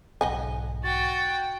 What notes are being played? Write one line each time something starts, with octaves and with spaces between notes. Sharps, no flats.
B1 G#2 D#5 F#5 G#5
F#4 G5 A6